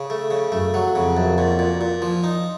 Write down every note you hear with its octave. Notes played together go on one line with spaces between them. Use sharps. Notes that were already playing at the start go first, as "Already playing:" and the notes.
Already playing: C#3
A3
C#3
F#2 A3
F#3
F2 C#3
F#2
A#2
A#2
A#2
F3
D#4